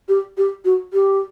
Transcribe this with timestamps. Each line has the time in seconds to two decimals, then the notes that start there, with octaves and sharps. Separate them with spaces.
0.09 G4
0.37 G4
0.65 F#4
0.93 G4